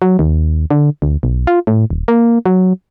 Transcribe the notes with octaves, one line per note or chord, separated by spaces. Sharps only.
F#3
D#2
D3
D2
B1
F4
A2
D#1
A#3
F#3